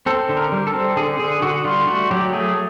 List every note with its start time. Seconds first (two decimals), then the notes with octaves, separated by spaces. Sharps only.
0.06 C4 A4
0.29 D3
0.37 A#4
0.52 G3
0.67 A4
0.74 C4
0.96 D3 G#4
1.19 D3 G#4
1.42 D3 F#4
1.65 G3 F4
1.88 A3 F#4
2.11 F#3 G4
2.32 A3 G#4